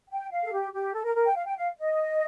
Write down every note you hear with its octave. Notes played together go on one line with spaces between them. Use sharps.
G5
F5
A4
G4
G4
A4
A#4
A#4
G5
F5
G5
F5
D#5